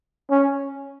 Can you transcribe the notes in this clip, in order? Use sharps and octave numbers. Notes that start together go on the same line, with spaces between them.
C#4